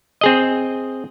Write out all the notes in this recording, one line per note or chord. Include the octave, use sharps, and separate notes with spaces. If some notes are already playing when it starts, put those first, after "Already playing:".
C4 G#4 D#5